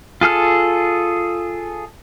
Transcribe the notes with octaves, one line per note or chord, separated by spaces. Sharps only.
F4 G#4 A4 F6